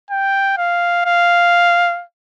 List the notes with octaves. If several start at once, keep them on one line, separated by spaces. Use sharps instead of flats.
G5
F5
F5